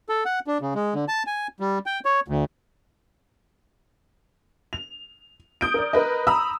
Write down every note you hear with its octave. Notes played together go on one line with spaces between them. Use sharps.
A4
F#5
D4
C#3
G#3
D3
A5
G#5
G3
G5
C#5
D2
F7
D#6 G6 D7
A#4 D5
A#4 B4 D#5
A#5 B5 D#6 E6